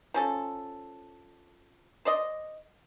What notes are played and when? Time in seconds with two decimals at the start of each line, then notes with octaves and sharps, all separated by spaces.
0.14 F3 C#4 A4
2.05 C5 D5 D#5